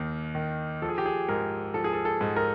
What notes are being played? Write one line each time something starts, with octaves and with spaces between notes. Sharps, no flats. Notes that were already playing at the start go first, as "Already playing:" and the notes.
Already playing: D#2 D#3
D#3
F3 A4
G#4
G4
G#4
G#2 A#4
F3 A4
G#4
A4
A4
G#2
A#4